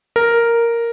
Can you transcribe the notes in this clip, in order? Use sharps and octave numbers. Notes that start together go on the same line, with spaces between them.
A#4